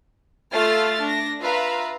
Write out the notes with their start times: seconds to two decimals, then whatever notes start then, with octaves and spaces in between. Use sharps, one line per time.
0.52 A3 F4 F6 A6
1.01 D4 A#6
1.42 F4 B4 E5 F5 A#5